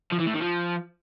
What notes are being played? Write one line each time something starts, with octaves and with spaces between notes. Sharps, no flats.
F3
E3
A2
D#3
F3